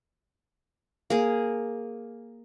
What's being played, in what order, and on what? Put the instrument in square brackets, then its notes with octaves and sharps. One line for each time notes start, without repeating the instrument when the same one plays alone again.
[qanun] A#3 G#4